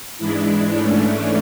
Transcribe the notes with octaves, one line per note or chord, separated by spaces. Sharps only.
G#2 E3 G#3 D4 E4
G#2 E3 A3 C#4 D4